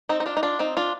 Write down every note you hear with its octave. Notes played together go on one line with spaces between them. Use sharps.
C4 D#4
D#4
D4 F4
D#4
D4 F4
C4 D#4
D4 F4